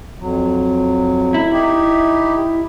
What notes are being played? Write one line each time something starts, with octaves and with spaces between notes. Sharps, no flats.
F2 F#3
E4
D#4 G4